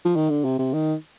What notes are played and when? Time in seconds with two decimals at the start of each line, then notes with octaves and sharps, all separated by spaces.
0.05 F3
0.16 D#3
0.30 D3
0.44 C3
0.59 C3
0.73 D#3